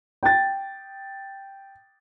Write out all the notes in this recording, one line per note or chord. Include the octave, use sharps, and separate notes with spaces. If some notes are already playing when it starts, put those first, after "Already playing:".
G5 A6